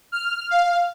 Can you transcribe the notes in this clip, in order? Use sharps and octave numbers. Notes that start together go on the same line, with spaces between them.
F6
F5